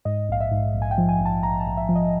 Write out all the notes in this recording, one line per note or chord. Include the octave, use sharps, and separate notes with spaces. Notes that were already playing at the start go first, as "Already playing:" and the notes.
G#2 D#5
A#1 F5
E5
G#2
A#1
G#5
G5
F3
G#5
A#1
A5
A#1 A#5
A5
A#1
E5
F3
D#5